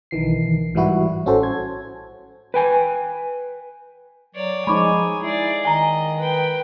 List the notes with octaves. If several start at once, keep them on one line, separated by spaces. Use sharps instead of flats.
B1 D#3 E3 C7
G#2 E3 G3 E4 F#4
A1 C#4 F#4 A4 C5
G#6
B4 G5 G#5
F#3 C#5 D5
F3 G#3 D#4 C#5 G#5 B5 C#6 D6
E4 G#4 D5
D#3 D#5 G#5 A#5
B4 G5